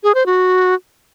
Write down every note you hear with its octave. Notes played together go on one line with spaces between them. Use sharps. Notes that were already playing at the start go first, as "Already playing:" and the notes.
G#4
C5
F#4